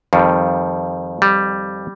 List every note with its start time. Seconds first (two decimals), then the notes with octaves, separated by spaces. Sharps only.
0.13 F2 D#3 G3
1.22 G3